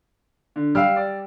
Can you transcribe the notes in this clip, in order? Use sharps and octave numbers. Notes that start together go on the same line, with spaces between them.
D3
G3 F5 E6 F6
D5